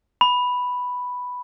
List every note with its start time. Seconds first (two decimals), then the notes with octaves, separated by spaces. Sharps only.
0.21 B5